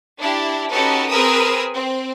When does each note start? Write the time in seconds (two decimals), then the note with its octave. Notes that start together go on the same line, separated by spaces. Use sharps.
0.19 D4 E4 G4
0.71 C#4 D#4 F#4 G4 A4 B4
1.09 C4 G#4 A#4 B4 D#6 E6
1.75 C4